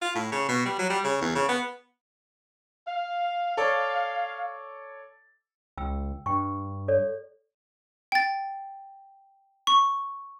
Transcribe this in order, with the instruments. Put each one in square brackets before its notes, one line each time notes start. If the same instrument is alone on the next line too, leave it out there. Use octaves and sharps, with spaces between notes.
[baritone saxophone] F4
A2
C#3
B2
G3
F#3
G3
C#3
E2
C#3
B3
[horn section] F5
[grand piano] A4 C#5 D5
[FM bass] C#2 [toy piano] G5 E6
[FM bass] G2 [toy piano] G5 C#6
[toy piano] A4 C#5 D5
[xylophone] G5 A6
C#6